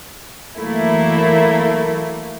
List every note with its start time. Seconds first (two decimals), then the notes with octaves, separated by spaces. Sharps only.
0.58 E3 F#3 A3 A#3 E4